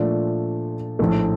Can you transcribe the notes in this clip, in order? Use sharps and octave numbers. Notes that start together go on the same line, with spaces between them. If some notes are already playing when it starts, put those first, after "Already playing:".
Already playing: A#2 F3 A3 D4
A#1 A2 A3